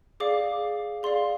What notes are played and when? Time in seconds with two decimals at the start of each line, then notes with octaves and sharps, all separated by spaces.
0.20 G#4 D5 F5 D6
1.03 G#4 D5 F5 C6